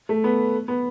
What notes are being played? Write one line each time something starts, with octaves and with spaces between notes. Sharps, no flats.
A3
B3
B3